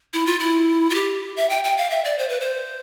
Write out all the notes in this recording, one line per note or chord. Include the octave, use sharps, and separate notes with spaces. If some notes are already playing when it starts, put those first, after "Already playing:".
E4
F4
E4
F4
G4
E5
G5
G5
F5
E5
D5
C5
B4
C5